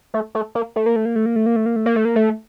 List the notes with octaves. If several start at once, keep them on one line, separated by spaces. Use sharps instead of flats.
A3
A3
A#3
A3
A#3
A3
A#3
A3
A#3
A3
A#3
A3
A#3
A3
A#3
A3
A#3
A3